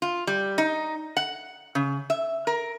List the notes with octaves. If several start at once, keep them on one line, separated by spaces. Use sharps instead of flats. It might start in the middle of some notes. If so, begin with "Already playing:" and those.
F4
G3
D#4
F#5
C#3
E5
A#4